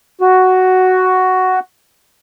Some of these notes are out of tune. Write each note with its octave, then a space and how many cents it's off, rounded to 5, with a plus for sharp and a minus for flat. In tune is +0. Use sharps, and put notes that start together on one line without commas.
F#4 +5